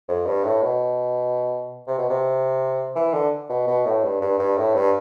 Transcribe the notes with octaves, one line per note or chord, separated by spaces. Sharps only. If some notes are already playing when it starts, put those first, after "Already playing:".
F2
G2
A2
B2
C3
B2
C3
E3
D3
B2
B2
A2
G2
G2
G2
A2
G2